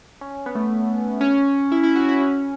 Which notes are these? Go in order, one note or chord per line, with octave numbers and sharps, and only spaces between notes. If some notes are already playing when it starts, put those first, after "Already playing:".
C#4
B3
A3
C#4
E4
E4
F#4
E4
C#4